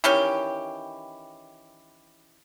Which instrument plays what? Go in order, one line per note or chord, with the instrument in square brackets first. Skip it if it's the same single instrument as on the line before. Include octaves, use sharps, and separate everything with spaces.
[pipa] D#3 E3 C#4 G4